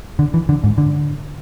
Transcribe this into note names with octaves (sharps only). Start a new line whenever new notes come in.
D3
E3
D3
G#2
D3